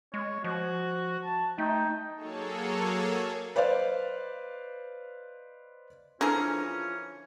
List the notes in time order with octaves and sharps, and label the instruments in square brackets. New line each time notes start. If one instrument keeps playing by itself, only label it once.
[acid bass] G#3 [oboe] C#5
[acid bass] F3 [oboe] F#4
[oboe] A5
[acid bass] A3 [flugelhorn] D#4 [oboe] G5
[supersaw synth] F#3 A#3 G#4 A4 C#5
[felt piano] B4 C5 D5 D#5 F5
[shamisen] D3 F3 [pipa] E3 G#4 A#4 [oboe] C#4 [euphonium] F4